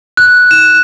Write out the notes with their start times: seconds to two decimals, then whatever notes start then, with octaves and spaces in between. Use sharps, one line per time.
0.17 F#6
0.51 E7